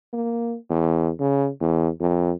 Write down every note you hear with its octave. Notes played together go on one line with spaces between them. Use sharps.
A#3
E2
C#3
E2
F2